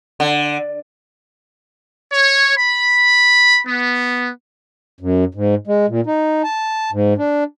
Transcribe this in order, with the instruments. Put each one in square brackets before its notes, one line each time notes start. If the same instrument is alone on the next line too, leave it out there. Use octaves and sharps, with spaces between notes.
[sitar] D3
[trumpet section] C#5
B5
B3
[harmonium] F#2
G#2
G#3
A#2
D#4
A5
G#2
D4